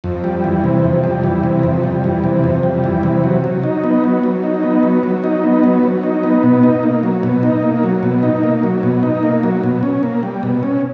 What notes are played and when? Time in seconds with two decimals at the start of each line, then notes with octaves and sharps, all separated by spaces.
0.04 F2
0.24 G3
0.44 E3
0.64 C3
0.84 F2
1.04 G3
1.24 E3
1.43 C3
1.63 F2
1.83 G3
2.04 E3
2.24 C3
2.44 F2
2.63 G3
2.84 E3
3.03 C3
3.24 F#3
3.44 F#3
3.63 D#4
3.84 B3
4.04 F#3
4.24 F#3
4.44 D#4
4.63 B3
4.83 F#3
5.03 F#3
5.24 D#4
5.44 B3
5.64 F#3
5.83 F#3
6.03 D#4
6.23 B3
6.43 B2
6.63 D#4
6.83 A#3
7.03 F#3
7.23 B2
7.43 D#4
7.63 A#3
7.83 F#3
8.03 B2
8.23 D#4
8.43 A#3
8.63 F#3
8.83 B2
9.03 D#4
9.23 A#3
9.43 F#3
9.63 B2
9.83 C#4
10.03 A#3
10.23 G3
10.43 B2
10.63 C#4